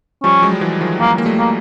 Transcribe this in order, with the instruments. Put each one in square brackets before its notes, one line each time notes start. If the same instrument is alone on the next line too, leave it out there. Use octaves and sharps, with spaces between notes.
[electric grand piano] F3 G3 [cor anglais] C#4
[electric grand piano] F#3 G#3
G3
E3 F#3
D#3 F3
[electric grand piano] F3 G3 [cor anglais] A#3
[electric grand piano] A#3
G3 A3
[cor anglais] A#3